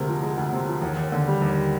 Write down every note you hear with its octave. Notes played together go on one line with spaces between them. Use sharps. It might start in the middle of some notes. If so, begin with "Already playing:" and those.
Already playing: D2 C3 G#3 A#4
F3
G#3
D2
C3
F3
D#2
D#2
D3
G3
D#2